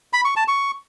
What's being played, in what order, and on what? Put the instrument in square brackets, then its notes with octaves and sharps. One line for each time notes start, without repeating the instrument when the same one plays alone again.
[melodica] B5
C#6
A5
C#6